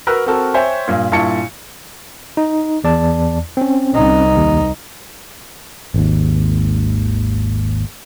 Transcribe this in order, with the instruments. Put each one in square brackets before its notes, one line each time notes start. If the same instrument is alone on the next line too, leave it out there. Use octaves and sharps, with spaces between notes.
[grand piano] F#4 A#4 B4 A#5 E6 F#6
C4 F#4 A4 A#4
C5 C#5 E5 G5 G#5
G2 A#2
G2 A#2 E4 A5 C#6 C#7
[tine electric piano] D#4
E2 D5 A5
C4 C#4
[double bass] C2 D#4
[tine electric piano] D#2
[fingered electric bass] G#1 D#2